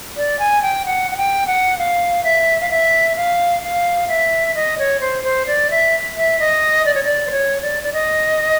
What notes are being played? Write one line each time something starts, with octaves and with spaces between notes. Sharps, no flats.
D5
G#5
G5
F#5
F#5
G5
F#5
F5
E5
F5
E5
F5
F5
E5
D#5
C#5
C5
C5
D5
E5
E5
D#5
D5
C#5
D5
C5
C#5
D5
D5
D#5